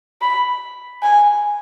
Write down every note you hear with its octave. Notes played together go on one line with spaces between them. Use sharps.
B5
G#5